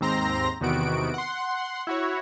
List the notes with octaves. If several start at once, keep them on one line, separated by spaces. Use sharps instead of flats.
D#2 G#2 C4 A#5 C6 A#6
E2 C3 D#3 B3 F#4 D7
F#5 C6
E4 F#4 C#5